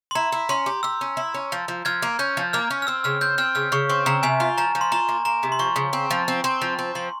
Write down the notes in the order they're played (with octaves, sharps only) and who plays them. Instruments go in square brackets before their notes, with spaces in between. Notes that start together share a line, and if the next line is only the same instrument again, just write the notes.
[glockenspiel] C6
[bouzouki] E4 [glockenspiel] A#5
[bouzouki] E4
[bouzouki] C#4 [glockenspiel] C6
[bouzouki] G4
[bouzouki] G4 [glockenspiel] E6
[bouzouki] C#4
E4
C#4
F3
F3
[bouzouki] F3 [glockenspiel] F6 G#6
[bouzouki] A#3
[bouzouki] C#4 [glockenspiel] G6
[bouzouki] F3
[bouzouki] A#3 [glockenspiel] F6
[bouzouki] C#4
[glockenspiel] F6
[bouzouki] C4 [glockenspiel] E6
[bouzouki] C#3 [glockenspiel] F6
[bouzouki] C4 [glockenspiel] G6
[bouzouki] C4 [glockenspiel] F6
[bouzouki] C#3 [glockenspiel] F6
[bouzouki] C#3 [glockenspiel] C#6
[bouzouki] C4 [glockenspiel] C#6
[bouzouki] C#3 [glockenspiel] A#5
[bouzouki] C3 [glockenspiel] G#5
[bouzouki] F4
[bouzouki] F3 [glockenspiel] A#5
[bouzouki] F3
[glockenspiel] C6
[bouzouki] F4 [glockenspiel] A#5
[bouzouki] A#3
[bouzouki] A#3 [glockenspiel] A#5
[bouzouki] C3
[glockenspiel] C6
[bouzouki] F3 [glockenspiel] C#6
[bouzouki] C#3
C4
F3
C4
C4
F3
C4
[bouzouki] F3 [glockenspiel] C6